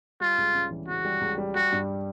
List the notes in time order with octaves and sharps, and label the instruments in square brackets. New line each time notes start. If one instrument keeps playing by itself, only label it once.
[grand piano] G3 [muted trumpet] F4
[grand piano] C#2
C#3
E3
[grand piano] C#3 [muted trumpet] F#4
[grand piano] G3
C#2
G3
[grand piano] G3 [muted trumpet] F#4
[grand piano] G2